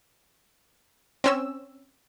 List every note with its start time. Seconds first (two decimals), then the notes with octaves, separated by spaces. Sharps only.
1.24 C4 C#4 E6